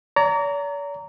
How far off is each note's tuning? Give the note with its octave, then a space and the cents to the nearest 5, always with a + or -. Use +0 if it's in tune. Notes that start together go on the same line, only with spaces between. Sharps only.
D5 -45 A#5 -15